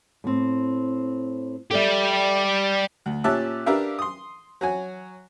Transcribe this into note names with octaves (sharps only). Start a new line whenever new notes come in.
A2 C4
G3 G4 A4 D5 E5
D2
A#2 C#4 G4 E5 A5 F#6
D4 G4 A#4 B4 E5 F5
C6 D#6
F#3 F#4 G#5